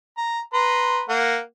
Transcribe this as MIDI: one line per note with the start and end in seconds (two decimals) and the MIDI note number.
0.17 0.40 82
0.54 1.01 71
0.54 1.01 82
0.54 1.01 84
1.09 1.38 58
1.09 1.38 78